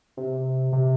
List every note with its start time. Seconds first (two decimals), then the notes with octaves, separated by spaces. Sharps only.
0.17 C3
0.73 C3